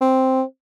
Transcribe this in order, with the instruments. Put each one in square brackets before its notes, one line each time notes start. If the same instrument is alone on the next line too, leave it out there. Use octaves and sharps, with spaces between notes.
[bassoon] C4